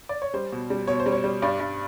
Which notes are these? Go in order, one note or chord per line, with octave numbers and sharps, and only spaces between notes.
D5
C#5
G3 C5
B2
G3
B2 C#5
C5
G3
C#5
G3
G2 D5
G2